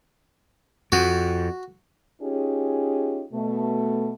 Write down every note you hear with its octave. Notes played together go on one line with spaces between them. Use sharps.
F2 F#4
C#4 D#4 F4 G4 G#4
B2 A3